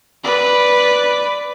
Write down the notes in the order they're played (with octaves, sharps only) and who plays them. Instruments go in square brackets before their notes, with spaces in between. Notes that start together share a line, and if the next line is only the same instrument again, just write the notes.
[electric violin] B4 D5